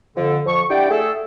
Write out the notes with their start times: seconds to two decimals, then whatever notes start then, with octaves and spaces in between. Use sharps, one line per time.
0.16 F2 D3
0.46 F2 F3 C#6
0.70 D4 E4 G4 D5 F#5 G5
0.91 A3 G#4 A4